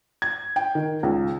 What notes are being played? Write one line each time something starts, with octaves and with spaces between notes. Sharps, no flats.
G#6
G5
D#3
C#2